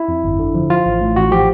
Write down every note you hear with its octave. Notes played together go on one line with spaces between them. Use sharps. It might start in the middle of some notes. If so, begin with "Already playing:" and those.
Already playing: E4
F2
G1
D3
F3
F3 F4
A1
A2
A1 F#4
F3 G4